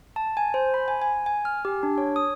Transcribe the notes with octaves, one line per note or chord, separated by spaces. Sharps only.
A5
G#5
C5
B5
G#5
G#5
G#5
F6
G4
D4
C#5
D#6